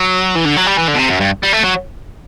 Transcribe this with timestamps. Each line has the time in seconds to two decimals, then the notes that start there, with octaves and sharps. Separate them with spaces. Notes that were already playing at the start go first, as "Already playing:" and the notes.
Already playing: F#3
0.36 E3
0.45 D3
0.57 F#3
0.67 G3
0.78 E3
0.88 D3
0.95 B2
0.99 C3
1.10 F#2
1.20 G2
1.43 G3
1.52 A3
1.63 F#3